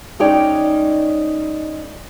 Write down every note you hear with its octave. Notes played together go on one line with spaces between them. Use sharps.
G#3 C#4 D#4 C#5 D5 G5